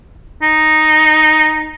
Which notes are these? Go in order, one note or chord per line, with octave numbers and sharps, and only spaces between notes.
D#4